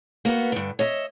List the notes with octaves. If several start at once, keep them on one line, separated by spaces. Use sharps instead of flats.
A#3 B3 F#4
G2 D3
C#5 D#5 E5